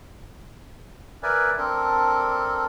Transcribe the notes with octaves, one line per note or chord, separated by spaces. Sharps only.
A#4 B4 D5 E5 G#5
C4 D4 A4 A#4